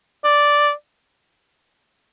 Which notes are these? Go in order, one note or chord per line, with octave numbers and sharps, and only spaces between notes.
D5